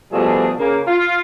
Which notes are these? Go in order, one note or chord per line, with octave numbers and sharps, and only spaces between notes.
B2 F3 G3 A3 D4 G#4
C#3 A#3
F4